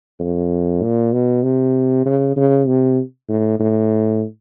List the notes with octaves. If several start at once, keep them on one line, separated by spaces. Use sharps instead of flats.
F2
A#2
B2
C3
C#3
C#3
C3
A2
A2